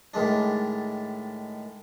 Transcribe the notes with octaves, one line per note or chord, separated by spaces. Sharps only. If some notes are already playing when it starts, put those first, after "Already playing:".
A2 D#3 G#3 D4